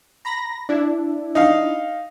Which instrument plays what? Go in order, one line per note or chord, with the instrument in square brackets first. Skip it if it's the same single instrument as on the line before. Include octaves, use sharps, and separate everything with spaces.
[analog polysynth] A#5 B5 A#6
D4 E4
[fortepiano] D#4 F5